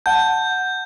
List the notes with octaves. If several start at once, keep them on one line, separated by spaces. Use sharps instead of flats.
F#5 A5 G6